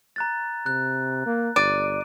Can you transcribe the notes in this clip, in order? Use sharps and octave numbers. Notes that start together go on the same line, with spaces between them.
A#5 F#6 A6
C3 F#6
A#3
G1 D5 D6 D7 D#7